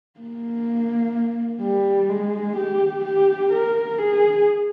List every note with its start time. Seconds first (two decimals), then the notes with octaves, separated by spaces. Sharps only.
0.20 A#3
1.61 G3
2.09 G#3
2.56 G4
3.04 G4
3.52 A#4
3.99 G#4